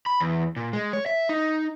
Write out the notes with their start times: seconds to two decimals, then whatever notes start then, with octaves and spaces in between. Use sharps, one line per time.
0.06 B5
0.20 E2
0.56 A#2
0.73 G#3
0.93 C#5
1.06 E5
1.29 D#4